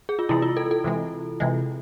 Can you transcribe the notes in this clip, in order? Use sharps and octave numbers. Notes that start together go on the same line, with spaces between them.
G#4
F4
C3 E3 G#3 E4
F4
A4
A4
C3 E3 G#3
C3 E3 G#3